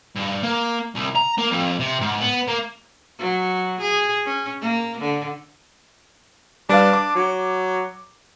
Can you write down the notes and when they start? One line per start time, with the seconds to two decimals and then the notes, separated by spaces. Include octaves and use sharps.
0.16 G2
0.43 A#3
0.95 C2
1.15 A#5
1.38 A#3
1.51 F2
1.79 C3
2.01 G#2
2.21 B3
2.48 A#3
3.19 F#3
3.80 G#4
4.25 C#4
4.61 A#3
5.00 D3
6.69 G3 D4 B4 F5
6.93 D6
7.15 F#3